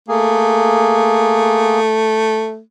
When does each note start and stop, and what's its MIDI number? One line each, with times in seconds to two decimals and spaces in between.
0.08 2.60 57
0.08 1.80 58
0.08 1.80 68